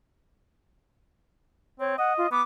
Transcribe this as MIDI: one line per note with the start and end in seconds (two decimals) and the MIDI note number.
1.80 1.97 60
1.80 1.97 73
1.98 2.29 75
1.98 2.13 78
2.18 2.27 65
2.31 2.42 59
2.31 2.42 86